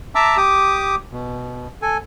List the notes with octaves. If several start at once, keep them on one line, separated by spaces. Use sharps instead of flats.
E5 A5 A#5 D6 E6
G4 D6 D#6
B2
A4 G#5